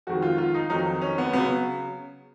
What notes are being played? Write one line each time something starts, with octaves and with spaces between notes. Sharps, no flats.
F2 D#3 G#3 F#4
F4
F4
D#4
F2 D#3 F#3 D#4
C#4
B3
C#3 F#3 B3